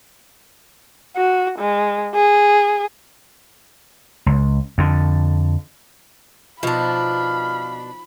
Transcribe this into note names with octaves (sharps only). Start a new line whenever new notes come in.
F#4
G#3
G#4
C#2
F2 D3
B2 F3 D4 D#4 F5 B5